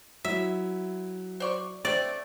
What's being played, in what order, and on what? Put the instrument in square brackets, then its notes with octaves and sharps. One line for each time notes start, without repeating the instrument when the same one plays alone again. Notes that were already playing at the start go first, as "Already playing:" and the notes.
[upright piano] F#3 E4 [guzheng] E5
[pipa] C5 D5 C#6
[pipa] A3 C4 [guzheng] D5